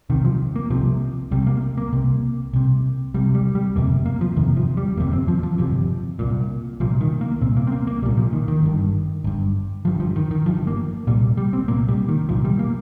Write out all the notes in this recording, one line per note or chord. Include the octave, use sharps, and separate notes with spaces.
C2 C3 D#3
F3
A#3
C2 C3 F3
C2 C3 G3
A#3
A#3
C2 C3
C2 C3
C2 C3 G3
G3
G3
G1 F2 C3 A#3
A#3
F3
G1 F2 C3 D#3
F3
G3
G1 F2 C3 A#3
C4
F3
F3
G1 F2 C3
C2 A#2
C2 A#2 F3
D#3
A#3
C2 A#2 C4
A#3
C4
A#3
A#3
C2 A#2 G3
F3
D#3
D#3
G1 G2
G1 G2
G1 G2 F3
F3
D#3
D#3
G1 G2 F3
A#3
C2 A#2 G3
G3
C4
C2 A#2 A#3
G3
D#3
C2 A#2 F3
G3
A#3